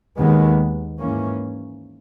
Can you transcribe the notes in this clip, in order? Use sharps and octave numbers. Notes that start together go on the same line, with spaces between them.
D#2 D#3 G#3 B3
G#2 E3 A#3 C#4